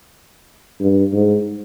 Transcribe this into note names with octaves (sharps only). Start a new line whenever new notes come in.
G2
G#2